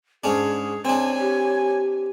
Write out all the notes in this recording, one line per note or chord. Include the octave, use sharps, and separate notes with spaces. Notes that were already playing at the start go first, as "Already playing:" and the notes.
G#2 C#4 D4 G#4
C4 D4 C#5 G#5
G4